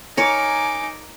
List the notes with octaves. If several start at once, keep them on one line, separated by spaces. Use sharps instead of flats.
D#4 A#4 C#5 G#5 D6